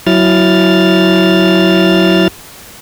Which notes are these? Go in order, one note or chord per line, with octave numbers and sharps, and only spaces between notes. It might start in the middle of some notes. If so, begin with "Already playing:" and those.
F#3 E4 F6 A6